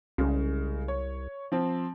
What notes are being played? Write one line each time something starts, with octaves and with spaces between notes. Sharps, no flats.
C2 C#3 G#3
C#5
F3 C4